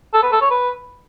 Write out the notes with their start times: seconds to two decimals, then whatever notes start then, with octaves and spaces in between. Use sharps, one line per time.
0.14 A4
0.23 B4
0.32 A4
0.42 C#5
0.51 B4